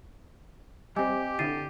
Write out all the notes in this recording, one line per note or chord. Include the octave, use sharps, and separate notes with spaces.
G3 C4 G4 D#5 G#5 D6
D3 E4 A6 C7 D#7